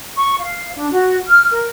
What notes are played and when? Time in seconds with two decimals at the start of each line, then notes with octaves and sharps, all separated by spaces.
0.17 C#6
0.38 F5
0.75 D4
0.91 F#4
1.26 F6
1.51 A#4